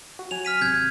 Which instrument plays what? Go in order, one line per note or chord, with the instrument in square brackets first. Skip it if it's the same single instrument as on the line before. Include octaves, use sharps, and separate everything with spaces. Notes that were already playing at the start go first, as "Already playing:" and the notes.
[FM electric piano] F#4
[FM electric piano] F#3 G#5 [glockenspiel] F7
[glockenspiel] F6 B6 D#7
[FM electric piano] G#1 C3 [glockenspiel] G6 G#6